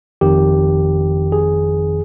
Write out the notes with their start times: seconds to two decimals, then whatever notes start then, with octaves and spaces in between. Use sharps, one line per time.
0.21 G1 F2 D#3 G4
1.32 G#4